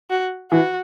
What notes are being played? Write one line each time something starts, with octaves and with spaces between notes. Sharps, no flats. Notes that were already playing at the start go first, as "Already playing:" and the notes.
F#4
E3 F#4